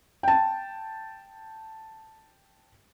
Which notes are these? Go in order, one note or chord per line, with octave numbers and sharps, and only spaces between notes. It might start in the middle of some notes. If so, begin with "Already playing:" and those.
G5 A5